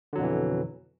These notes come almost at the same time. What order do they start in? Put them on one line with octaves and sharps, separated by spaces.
D3 F#3 F2 B2 E3